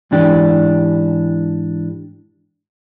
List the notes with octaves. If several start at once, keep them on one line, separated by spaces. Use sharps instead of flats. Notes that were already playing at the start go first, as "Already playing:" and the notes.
G#2 E3 D4 G4